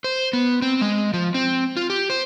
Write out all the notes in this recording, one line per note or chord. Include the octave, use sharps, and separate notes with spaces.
C5
B3
C4
G#3
F3
C4
F4
G4
C5